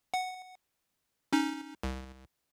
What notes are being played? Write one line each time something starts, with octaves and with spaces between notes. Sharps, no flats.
F#5
C#4 D#4
C2